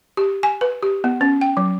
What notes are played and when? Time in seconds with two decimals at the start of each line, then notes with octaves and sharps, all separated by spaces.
0.17 G4
0.43 G#5
0.61 B4
0.83 G4
1.04 B3
1.21 C#4
1.41 G5
1.57 F#3